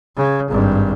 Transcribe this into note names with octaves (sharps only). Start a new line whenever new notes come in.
C#3
G#1 G2